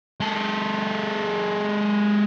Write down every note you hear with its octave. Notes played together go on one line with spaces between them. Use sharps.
G#3 A4